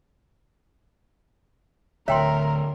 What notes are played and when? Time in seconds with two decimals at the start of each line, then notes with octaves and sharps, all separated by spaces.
2.08 D1 D2 A#4 C#5 E5 G5 C6